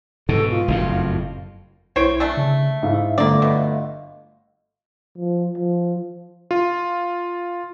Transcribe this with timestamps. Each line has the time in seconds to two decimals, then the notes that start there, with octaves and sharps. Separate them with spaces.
0.29 G#2 B2 A4
0.51 F4
0.68 F#1 F2 A2
1.96 B1 E4 C5 C#5 C7 D7
2.20 A3 D4 A4
2.37 C#3
2.83 G#2 E4 E5 F5
3.18 G1 A3 A#3 D5
3.42 B2
5.18 F3
5.58 F3
6.51 F4